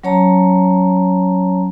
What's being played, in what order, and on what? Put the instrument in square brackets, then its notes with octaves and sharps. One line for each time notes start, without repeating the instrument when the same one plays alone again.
[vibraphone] F#3 C#4 C#5 A5 A#5